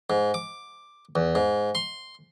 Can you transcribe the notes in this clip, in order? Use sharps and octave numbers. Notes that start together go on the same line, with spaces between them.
G#2
D6
E2
G#2
C6